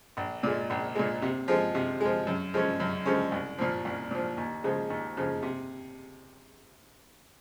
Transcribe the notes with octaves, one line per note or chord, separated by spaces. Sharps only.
A#1
A#2 G#3
A#1
A#2 G#3
C3
F3 G#3
C3
F3 G#3
F#2
F3 G#3 C#4
F#2
F3 G#3 C#4
C2
A#2 F3
C2
A#2 F3
D#2
C#3 F3 G#3
D#2
C#3 F3 G#3
C3